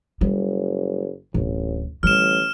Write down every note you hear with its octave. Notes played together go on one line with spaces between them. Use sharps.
F#1 G3
D1 A1
A1 D3 G3 F6 E7